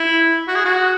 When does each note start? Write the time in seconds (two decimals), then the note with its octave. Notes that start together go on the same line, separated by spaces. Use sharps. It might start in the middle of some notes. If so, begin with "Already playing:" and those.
Already playing: E4
0.48 F#4
0.56 G#4
0.65 F#4